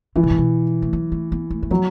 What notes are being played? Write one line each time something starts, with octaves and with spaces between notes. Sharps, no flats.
D3 E3
B2
A2
B2
A3
F#3
A3
B3
A3
A3
F#3 B3